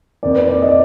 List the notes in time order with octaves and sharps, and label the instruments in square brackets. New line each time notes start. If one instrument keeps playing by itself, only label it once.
[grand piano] F2 D#3 A#3 [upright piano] D5
[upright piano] B4
D5
D#5
D5